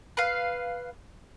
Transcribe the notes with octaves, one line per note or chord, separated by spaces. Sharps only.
B4 F5